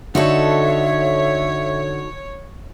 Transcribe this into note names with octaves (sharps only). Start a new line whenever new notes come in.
D3 D#4 F#4 A4 C#5 E5